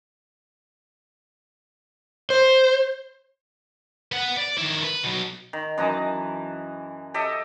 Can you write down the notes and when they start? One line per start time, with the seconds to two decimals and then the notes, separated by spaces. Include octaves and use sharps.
2.30 C5
4.12 B3 F#5
4.37 D5
4.58 D#3 E4
4.84 B4
5.04 B2 F#3
5.53 D#3
5.78 F#2 E3 D#5 A5
7.14 G4 A4 D#5 E5